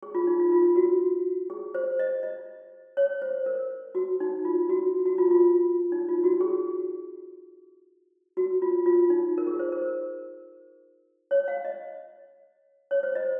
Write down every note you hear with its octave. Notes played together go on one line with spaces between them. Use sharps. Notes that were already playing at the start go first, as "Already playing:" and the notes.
G#4
F4
D#4
F4
F4
F#4
G#4
C5
D#5
D#5
C#5
C5
A#4
F#4
D#4
F4
F#4
F#4
F4
F4
D#4
F4
F#4
G#4
F#4
F4
F4
D#4
A#4
G#4
C5
A#4
C#5
F5
D#5
C#5
C5
D#5